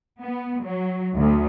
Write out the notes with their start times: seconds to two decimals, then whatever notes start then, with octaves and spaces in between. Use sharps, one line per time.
0.22 B3
0.64 F#3
1.17 D2